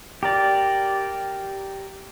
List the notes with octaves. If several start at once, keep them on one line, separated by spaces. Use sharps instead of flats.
G4 A#4 D5